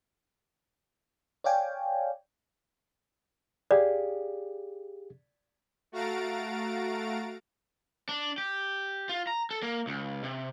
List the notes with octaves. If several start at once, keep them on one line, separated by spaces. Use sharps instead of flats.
C#5 D5 F5 G5 G#5
G4 G#4 D5 F5
A3 F#4 F5 A#5 A6 D7
D4
G4
F4
A#5
A4
A#3
C#2
C3